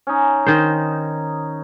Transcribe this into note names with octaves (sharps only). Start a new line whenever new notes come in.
C#4 D#4
D#3 C5